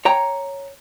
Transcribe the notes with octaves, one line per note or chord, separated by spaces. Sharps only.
C#5 G5 A#5